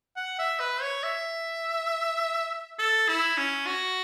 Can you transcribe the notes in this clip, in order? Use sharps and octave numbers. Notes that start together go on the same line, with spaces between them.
F#5
E5
B4
C#5
E5
A4
E4
C#4
F#4